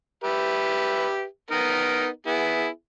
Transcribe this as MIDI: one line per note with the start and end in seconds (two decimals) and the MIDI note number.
0.24 1.24 67
0.24 1.24 71
0.24 1.24 76
1.51 2.07 59
1.51 2.07 63
1.51 2.07 70
2.27 2.67 59
2.27 2.67 64
2.27 2.67 68